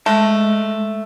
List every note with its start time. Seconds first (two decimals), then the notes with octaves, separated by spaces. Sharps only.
0.06 G#3 A3